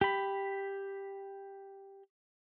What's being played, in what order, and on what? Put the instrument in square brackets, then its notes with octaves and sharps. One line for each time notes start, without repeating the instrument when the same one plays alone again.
[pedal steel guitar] G4 B5